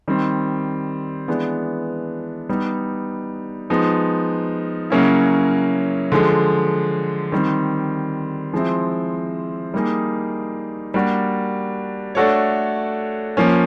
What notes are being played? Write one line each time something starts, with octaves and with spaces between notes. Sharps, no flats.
D#3 G3 C4
E3 G#3 B3 D4
G3 B3 D#4
F3 G#3 B3 D#4
C#3 F#3 A#3 C#4 E4
D3 F3 G#3
D#3 G3 C4
F3 G#3 C4 E4
G3 A#3 D#4 G#4
G3 A#3 D4 F#4
A3 D4 F#4 A4 C#5
F3 A#3 C#4